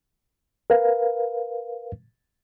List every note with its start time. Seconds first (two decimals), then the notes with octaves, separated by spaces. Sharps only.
0.70 A#4 B4 F5